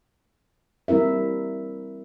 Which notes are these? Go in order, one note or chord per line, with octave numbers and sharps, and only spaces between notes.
G3 C4 E4 A#4 E5